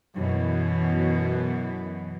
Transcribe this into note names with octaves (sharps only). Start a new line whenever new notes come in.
F#2 B2 E3